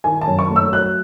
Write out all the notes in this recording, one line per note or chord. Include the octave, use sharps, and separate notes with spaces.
D#3 G#5
A5
F#2
C#6
A3
E6
F#3 F#6